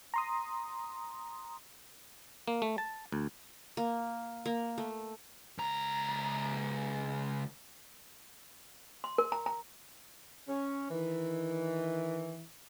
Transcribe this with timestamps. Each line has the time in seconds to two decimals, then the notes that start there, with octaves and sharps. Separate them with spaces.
0.14 A#5 C6 D#6
2.48 A#3
2.62 A3
2.78 A5
3.12 D2
3.77 A#3
4.46 A#3
4.78 A3
5.58 C#2 A#5
9.04 C6
9.18 A#4
9.32 A#5
9.46 A#5
10.48 C#4
10.90 D#3 E3